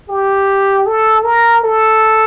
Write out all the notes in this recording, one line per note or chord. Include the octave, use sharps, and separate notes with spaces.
G4
A4
A#4
A4